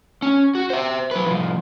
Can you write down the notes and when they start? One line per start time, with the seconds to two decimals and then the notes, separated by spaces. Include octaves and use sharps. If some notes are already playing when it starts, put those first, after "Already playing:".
0.22 C#4
0.55 F#4
0.70 C5 E5
1.11 F#3 B4
1.27 C2 F3